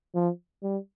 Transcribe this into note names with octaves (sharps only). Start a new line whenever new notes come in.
F3
G3